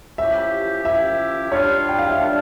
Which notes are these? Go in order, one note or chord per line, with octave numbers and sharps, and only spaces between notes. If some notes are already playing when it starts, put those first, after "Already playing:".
F3 C#4 E4 G4 E5
F3 C#4 E4 G4 E5
G3 D4 F4 C#5
G5
F5
E5
G3 D4 F4 D5